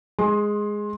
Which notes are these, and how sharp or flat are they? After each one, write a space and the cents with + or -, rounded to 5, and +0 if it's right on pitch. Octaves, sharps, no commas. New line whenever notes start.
G#3 +0 C6 +15